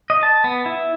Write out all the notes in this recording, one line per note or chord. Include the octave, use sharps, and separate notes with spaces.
D#5
A5
B3
E4